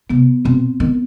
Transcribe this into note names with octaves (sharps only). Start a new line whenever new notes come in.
C3 B3
B2 C4
D#3 B3